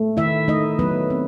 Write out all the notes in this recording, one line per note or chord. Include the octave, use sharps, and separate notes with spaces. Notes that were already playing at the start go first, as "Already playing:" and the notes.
Already playing: A3
D#3 E4 E5
A3 D#4 D#5
F#3 B3 B4
C4